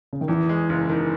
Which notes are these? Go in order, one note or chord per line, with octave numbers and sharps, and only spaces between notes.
C#3
D#3
E2 E3
G#3
F#1
D#3